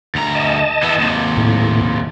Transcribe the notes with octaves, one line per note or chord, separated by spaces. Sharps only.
D2 A#5
D#5 A5
E3 B3
D#2 C3
A2